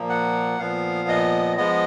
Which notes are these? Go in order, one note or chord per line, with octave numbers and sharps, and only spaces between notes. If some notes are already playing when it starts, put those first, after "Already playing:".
Already playing: A#2 F3 A#3
F#5
A#2 F3 B3 F5
D#5
F3 G#3 B3 D#5